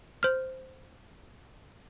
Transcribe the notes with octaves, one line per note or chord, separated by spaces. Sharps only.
C5 F6